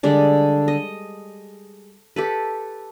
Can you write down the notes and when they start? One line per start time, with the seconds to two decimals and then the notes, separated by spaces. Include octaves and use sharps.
0.03 D3 G3 G#3 D4
0.68 D#5
2.16 G4 A4 B4